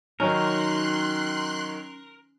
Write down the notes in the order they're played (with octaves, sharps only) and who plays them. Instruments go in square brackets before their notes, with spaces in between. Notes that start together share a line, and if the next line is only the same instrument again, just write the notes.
[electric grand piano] D#3 F#3 D#4 [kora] C#4 [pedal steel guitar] A#4 [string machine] C6 F#6